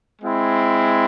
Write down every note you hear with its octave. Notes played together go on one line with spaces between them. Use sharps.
G#3 C4 E4